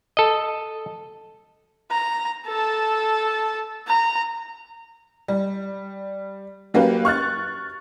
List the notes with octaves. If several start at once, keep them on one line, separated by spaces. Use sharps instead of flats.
A4 D#5
A#5
A4 A5
A#5
G3
F#3 A#3 C#4 G4 B4
C#6 F6 F#6 A6